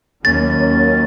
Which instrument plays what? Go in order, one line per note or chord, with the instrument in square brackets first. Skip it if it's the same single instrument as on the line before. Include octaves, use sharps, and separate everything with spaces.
[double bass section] D#2 D#3 F#3 A#3 C#4 [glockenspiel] A6